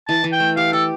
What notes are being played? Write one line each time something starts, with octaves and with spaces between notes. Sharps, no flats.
E3 A5
E3
G5
A3
G4 F5
G4 A4